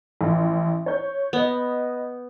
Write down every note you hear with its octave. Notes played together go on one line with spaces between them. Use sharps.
A1 F3
C#5 G6
B3 B4 D#5